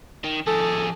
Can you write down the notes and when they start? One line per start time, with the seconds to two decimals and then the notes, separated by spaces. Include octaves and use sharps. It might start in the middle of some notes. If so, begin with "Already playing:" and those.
0.24 D#3
0.47 F2 G#4 A4